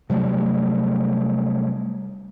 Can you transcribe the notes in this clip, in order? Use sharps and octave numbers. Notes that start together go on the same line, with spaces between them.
C3 F#3 G3 A3